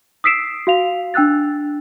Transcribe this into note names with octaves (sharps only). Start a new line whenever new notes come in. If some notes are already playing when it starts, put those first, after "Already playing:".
D#6 E6 B6 C7 D7 E7
F#4 F5 F7
D4 G5 E6 F#6 A6